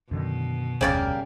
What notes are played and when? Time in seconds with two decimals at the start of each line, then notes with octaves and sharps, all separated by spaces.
0.11 F#2 B2 D3 D#3
0.81 F1 D2 C#3 G3 A3 A#3 D5